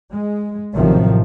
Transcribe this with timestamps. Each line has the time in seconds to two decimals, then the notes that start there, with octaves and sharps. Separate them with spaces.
0.11 G#3
0.73 A1 C3 D#3 F3 F#3